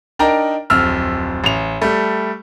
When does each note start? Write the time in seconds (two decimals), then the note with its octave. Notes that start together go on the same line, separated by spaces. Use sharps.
0.19 D4 D#4 A#4 G5 A#5
0.70 D1 F2 E6 F6
1.44 A1 F7
1.82 G3 A3